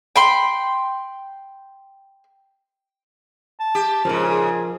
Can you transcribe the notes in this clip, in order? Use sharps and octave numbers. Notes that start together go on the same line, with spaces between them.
G5 B5 C6
A5
G4
G#2 C#3 F3 A#4
G#4